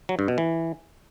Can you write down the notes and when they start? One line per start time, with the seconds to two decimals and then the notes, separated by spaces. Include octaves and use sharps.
0.09 F#3
0.19 G2
0.28 B2
0.38 E3